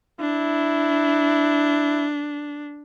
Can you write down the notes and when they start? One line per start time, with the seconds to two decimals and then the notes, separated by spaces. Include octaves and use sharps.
0.20 D4 E4